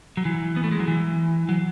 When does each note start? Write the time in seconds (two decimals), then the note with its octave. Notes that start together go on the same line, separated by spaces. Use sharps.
0.17 F#3
0.25 E3
0.56 B3
0.64 A3
0.71 G#3
0.80 F#3
0.88 E3
1.49 F#3